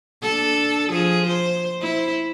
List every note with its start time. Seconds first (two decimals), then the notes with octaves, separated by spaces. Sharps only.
0.22 D4 A4
0.90 F3 G#4
1.27 C5
1.81 E4 C5